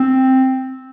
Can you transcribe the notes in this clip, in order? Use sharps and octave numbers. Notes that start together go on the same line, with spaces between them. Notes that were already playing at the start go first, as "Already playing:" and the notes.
Already playing: C4